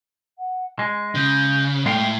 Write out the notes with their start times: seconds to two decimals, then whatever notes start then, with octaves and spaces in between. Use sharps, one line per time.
0.38 F#5
0.79 G#3 D#5
1.15 C#3 G6
1.86 A2 G#3 F5 G5 C7